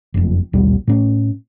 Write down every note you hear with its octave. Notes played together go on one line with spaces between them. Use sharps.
F#1 F2
A#1 D#2 B2 G3
A2 C#4